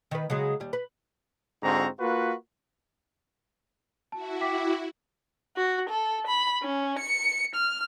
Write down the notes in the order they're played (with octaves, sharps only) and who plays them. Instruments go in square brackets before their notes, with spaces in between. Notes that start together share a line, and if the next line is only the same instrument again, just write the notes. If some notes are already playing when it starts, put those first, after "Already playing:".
[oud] D#3 B4
C#3 F#3 G#3
D#2 G3
B4
[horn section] G#2 D3 C4 F4 F#4 A#5
A#3 F4 F#4 B4
[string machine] E4 F#4 [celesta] A5
[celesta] G5 D6 B6
[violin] F#4
A4
B5
C#4
C#7
F6